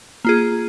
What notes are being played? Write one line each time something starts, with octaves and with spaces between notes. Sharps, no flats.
A#3 F4 G#4